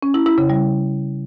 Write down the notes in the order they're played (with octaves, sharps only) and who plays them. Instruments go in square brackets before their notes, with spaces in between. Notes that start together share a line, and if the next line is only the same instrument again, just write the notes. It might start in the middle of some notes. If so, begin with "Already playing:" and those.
[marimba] C#4
E4
E4
C#3
G3